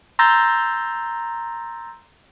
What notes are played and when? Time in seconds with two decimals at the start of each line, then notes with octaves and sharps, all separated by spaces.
0.19 A#5 C6 E6 G6 A6 A#6